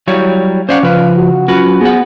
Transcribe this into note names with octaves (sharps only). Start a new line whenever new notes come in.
F#3 G3 E4 C#5 F5
C#4 C5 D5 F5 F#5
C#3 F3 B4 F5
F#4
F#3 C#4 F4 F#4 B4
B3 G#4 C5 F#5